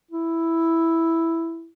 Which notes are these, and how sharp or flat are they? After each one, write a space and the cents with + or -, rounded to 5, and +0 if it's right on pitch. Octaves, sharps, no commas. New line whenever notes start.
E4 +0